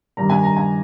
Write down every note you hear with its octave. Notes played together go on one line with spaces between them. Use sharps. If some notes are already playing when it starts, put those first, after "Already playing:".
G2 D#3 G3 A#5
G#5
A#5
G#5